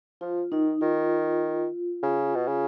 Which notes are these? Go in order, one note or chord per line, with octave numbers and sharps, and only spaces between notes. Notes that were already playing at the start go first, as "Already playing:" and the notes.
F3 F4
D#3 D#4
D#3 F4
C#3
B2
C#3